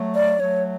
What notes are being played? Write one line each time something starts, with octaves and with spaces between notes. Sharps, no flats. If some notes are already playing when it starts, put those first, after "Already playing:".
Already playing: F#3 A3
D5
F#3 A3 C#5